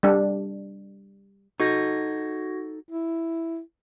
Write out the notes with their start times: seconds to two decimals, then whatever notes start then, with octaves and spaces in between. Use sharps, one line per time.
0.03 G3 D4
1.60 D#4 F#4 A4 D#5 G#6 A#6
2.89 E4